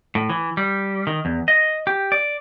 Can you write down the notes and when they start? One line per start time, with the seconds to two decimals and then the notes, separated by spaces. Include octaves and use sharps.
0.15 A2
0.30 E3
0.57 G3
1.07 D#3
1.25 E2
1.48 D#5
1.87 G4
2.12 D5